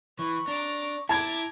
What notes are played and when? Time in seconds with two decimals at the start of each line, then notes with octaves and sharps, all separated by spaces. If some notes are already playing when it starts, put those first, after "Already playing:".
0.19 E3 B4 C#6
0.48 D4 A#5 D6
1.09 E4 A5 A#5 D6 G#6